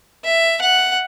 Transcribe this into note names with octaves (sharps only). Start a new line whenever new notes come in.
E5
F#5